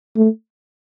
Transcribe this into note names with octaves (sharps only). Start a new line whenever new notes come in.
A3